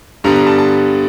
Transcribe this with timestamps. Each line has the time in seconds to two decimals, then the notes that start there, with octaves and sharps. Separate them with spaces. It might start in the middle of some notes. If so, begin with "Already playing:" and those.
0.24 G2 D3 G3 B3 A#5
0.36 A#5
0.47 A5
0.58 A5